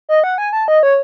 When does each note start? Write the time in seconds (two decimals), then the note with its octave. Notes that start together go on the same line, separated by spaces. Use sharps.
0.09 D#5
0.24 F#5
0.38 G#5
0.53 A5
0.68 D#5
0.83 C#5